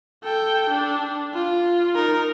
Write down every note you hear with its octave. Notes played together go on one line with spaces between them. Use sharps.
A4 G5
D4
F4
D#4 A#4